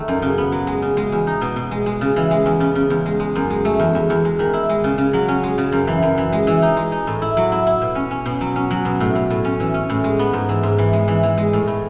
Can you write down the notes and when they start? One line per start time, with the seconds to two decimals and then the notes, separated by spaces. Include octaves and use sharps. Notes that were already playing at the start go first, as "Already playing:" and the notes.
Already playing: D#3 A3
0.08 F#2
0.22 C#3
0.38 B3
0.52 F#3
0.67 G#3
0.82 C#3
0.97 G#3
1.12 E2
1.27 D#4
1.41 B2
1.56 B2
1.71 G#3
1.86 G#3
2.01 C#3
2.16 E3
2.31 G#3
2.46 E2
2.60 C#3
2.75 C#3
2.90 E2
3.06 G#3
3.20 G#3
3.35 F#2
3.50 G#3
3.65 A3
3.79 E2
3.95 E2
4.10 E2
4.25 G#3
4.39 D#3
4.53 E4
4.69 G#3
4.84 C#3
4.98 C#3
5.13 F#3
5.28 C#4
5.44 G#3
5.58 C#3
5.72 F#2
5.87 E3
6.02 F#2
6.18 E3
6.32 G#3
6.47 E3
6.62 D#4
6.77 G#3
6.92 D#4
7.07 A2
7.22 E4
7.37 F#3
7.52 E4
7.67 E4
7.81 B2
7.95 C#4
8.11 C#4
8.26 B2
8.41 F#3
8.56 C#4
8.71 F#3
8.85 B2
9.00 A2
9.15 A2
9.30 A2
9.45 C#4
9.60 E3
9.74 C#4
9.90 A2
10.04 G#3
10.19 B3
10.33 G#2
10.49 E3
10.63 G#2
10.78 E3
10.93 G#3
11.08 E3
11.23 E3
11.38 G#3
11.53 A2
11.67 A2